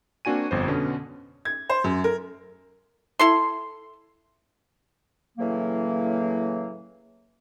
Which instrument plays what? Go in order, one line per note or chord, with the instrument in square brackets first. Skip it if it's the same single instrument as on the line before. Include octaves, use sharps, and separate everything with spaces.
[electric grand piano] A#3 C4 D4 F#4 G#5 D#7
G1 F2 C5
B2 D3 B3 C#4
[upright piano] G#6
C5
F#2
A#4
[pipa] E4 A4 C6
[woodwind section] A2 C#3 E3 F#3 A#3